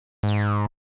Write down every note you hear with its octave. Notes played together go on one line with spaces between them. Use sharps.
G#2